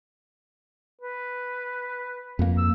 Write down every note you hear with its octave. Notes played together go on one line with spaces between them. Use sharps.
B4
F2 A#3
E6